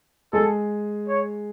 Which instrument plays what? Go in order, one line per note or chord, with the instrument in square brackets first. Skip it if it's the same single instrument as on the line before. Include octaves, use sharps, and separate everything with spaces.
[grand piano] G#3 G#4 [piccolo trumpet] A4
[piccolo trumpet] C#5